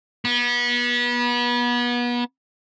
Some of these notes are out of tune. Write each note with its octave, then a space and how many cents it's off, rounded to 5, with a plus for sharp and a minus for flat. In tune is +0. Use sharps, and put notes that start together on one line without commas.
B3 -30